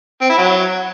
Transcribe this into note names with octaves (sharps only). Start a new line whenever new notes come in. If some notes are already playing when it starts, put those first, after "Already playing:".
C4
E4
F#3